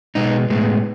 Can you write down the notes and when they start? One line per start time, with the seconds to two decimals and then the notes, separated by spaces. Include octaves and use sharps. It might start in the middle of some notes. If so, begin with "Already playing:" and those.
0.15 B2 G#3 B3 D#4
0.50 A2 G#3 B3